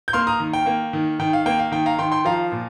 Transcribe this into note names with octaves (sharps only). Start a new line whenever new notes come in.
G6
A#3 C6 F6
A#5 D#6
D#3
G5
A#3
D#3
D#3 G5
F5
A#3 G5
F5
D#3 G5
F5 A#5
D#3 G5 C6
G5 C6
F3 F5 A#5
A#2